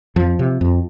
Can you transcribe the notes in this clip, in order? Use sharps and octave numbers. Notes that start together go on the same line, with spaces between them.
F2 F3
C3
F2